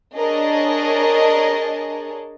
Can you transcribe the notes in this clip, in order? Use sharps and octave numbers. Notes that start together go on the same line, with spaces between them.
D4 G#4 A#4 C#5 D#5 A5